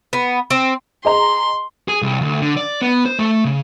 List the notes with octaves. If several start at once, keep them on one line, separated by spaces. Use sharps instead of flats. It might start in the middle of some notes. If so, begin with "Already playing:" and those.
B3
C4
G#4 D#5 A#5 C6
G#4
C2
D2
D3
D5
B3
C5
A3
C#3